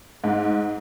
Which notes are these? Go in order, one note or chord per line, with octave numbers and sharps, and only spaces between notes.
G#2